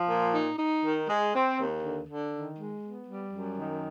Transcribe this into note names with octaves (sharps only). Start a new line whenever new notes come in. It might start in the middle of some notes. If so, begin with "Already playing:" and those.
Already playing: F3
A#2
D#4
D#4
D#3
G#3
C4
D#2
D3
D3
D#3
G#3
B3
G3
F#2
D#3